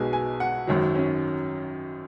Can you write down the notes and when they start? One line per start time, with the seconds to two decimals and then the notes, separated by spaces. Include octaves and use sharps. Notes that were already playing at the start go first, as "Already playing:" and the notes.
Already playing: B1 B2 G#3 G#5
0.13 G#5
0.40 F#5
0.67 G#1 F#2 D#3 F#3
0.95 C#4